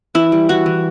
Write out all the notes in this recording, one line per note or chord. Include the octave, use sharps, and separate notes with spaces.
E3 E4
G3
E3 F#4
E3